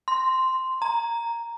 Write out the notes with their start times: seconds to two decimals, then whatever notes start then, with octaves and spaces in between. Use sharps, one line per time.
0.08 C6
0.82 A#5